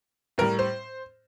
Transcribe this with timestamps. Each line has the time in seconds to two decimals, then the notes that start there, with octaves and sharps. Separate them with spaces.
0.38 A2 G3 A#4
0.59 C5